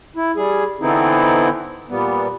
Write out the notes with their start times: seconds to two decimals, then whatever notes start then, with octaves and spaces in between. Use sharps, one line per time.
0.16 E4
0.36 G3 G#4
0.81 D3 E3 B3 C4 D#4 E4
1.89 A#2 G3 B3